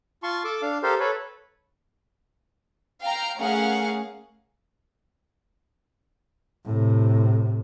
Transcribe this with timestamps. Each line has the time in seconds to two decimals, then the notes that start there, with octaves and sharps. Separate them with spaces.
0.23 F4 A5 C6 C#6
0.45 A4 A5 D6
0.62 D4 F5
0.83 G4 A4 A#4 C5 F5
1.00 A4 B4 C#5
3.02 F5 G5 A#5
3.39 A3 C#4 G#4 A#4 F5 F#5
6.66 A2 C3